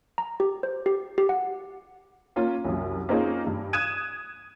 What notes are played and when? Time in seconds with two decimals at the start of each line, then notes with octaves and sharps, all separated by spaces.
0.18 A#5
0.40 G4
0.63 C5
0.86 G4
1.18 G4
1.29 F#5
2.36 A#3 C#4 F4
2.65 C2 F#2
3.09 A#3 C4 C#4 D#4 F4 G#4
3.46 G2
3.73 D#6 F#6 G#6 D#7 E7